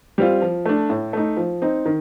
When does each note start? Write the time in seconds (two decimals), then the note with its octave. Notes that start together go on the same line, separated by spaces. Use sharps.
0.18 G3 C4 F4
0.42 F3
0.65 A3 D4
0.90 A2
1.13 A3 D#4
1.37 F3
1.62 C4 D#4
1.85 D#3